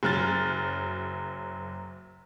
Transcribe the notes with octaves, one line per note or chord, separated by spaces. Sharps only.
F#1 F#3 F6 A6